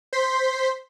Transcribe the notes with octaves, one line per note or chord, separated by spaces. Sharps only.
C5 C6 B6